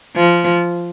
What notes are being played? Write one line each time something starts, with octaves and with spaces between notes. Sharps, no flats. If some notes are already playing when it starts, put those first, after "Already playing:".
F3